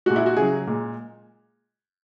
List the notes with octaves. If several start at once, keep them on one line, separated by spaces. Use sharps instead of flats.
A#2 G#3 F#4
E4
F#4
C#3 F#3 G#4
A#2 G#3